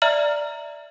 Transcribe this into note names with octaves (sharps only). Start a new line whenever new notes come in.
D5 E5 A#5 F6 F#7